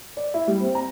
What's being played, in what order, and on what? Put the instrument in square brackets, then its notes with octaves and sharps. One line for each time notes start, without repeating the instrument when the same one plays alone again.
[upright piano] D5
E4
G3
C4
A#5